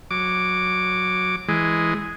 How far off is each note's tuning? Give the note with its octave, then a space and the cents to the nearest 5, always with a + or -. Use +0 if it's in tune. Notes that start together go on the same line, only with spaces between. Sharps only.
F#3 -15 D6 +0
E3 +0 G#3 +0